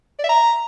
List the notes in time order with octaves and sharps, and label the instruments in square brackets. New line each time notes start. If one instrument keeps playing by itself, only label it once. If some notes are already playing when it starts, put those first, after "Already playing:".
[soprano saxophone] D5
E5
A#5